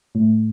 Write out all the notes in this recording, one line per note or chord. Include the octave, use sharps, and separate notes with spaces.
A2